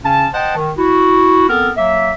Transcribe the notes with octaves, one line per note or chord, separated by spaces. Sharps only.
C#3 C#4 A5
C5 D#5 F#5 G5 A5
D#3
E4 F#4
B3 C4 A4 A#4
F#3 A#3 E5